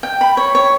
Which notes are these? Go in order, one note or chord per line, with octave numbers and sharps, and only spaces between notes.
G5
B5
C#5
C#5